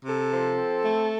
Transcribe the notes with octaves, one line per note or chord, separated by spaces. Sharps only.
C3 A4
F3
C4
A3